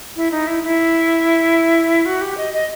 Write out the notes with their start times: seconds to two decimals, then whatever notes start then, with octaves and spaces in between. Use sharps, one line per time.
0.16 E4
0.31 D#4
0.47 E4
0.63 E4
2.06 F#4
2.21 G4
2.37 D#5
2.54 D#5